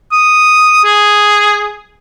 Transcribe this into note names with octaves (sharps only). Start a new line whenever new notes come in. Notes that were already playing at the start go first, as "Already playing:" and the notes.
D#6
G#4